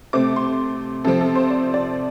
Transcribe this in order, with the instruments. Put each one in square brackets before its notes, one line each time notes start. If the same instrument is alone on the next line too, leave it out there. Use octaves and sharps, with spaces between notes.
[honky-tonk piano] C3 A3 C4 D6
C6
C3 F3 C4 A4
A4
C5
D5
D5